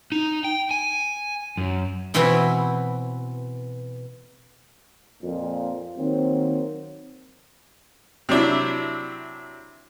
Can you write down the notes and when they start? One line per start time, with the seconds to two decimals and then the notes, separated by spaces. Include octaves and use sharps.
0.12 D#4
0.44 G5
0.71 G#5
1.57 F#2
2.14 B2 E3 C4 E4 F#4 B4
5.21 F2 A#2
5.96 D#3 F#3 A#3 C4
8.29 C3 F#3 D4 E4